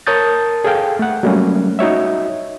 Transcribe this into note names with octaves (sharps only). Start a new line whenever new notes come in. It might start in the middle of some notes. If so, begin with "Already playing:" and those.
A#4 C#5 A5 D#6 G6 A6
G#4 A4 F5 G5
A3 F#5
F#3 G3 A3 A#3 C#4
D#4 F#4 C#5 E5